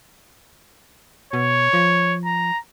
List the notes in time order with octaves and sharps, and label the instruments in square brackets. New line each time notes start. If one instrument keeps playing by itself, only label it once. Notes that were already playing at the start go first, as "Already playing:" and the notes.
[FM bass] B2 [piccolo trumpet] C#5
[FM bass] F3
[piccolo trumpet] A#5